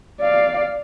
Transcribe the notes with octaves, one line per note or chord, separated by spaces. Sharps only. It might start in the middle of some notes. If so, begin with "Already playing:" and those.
D5 F5